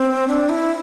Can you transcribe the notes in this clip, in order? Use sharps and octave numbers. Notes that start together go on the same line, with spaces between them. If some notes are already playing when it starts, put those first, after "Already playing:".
Already playing: C4
D4
E4